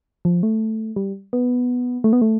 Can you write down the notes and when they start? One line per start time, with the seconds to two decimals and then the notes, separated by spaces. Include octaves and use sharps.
0.25 F3
0.43 A3
0.96 G3
1.33 B3
2.04 A3
2.13 B3
2.22 A3